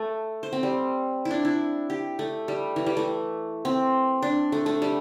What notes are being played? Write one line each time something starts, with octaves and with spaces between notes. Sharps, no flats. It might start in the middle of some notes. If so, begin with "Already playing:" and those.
Already playing: A3
C5
C4
G3
E4
D4
E4
G4
A3
G3
E3
G3
A3
C4
D4
A3
A3
G3